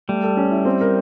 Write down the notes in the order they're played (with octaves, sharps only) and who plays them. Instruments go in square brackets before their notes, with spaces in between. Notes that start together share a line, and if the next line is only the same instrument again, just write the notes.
[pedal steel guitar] G3 [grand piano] A3
[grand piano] A4
C#4
E4
C4
A#4